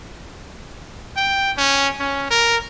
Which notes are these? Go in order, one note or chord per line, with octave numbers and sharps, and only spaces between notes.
G5
C#4
C#4
A#4